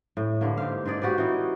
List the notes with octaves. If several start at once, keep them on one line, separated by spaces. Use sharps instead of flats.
A2
G2 D3 A#3
G#2 G4 C5 F5
G#2 D#4 G#4 D5
F#4 G4 B4 D5
E3 C#4 D#4